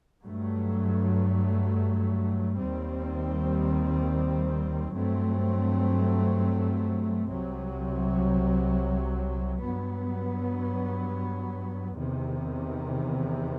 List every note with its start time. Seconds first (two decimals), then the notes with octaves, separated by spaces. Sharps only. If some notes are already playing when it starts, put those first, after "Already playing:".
0.24 G2 F#3 A3
2.58 D#2 D#3 G3 C4
4.93 G2 F#3 A3 C4
7.27 C2 C3 F#3
9.62 G2 F#3 B3
11.96 E2 C3 D#3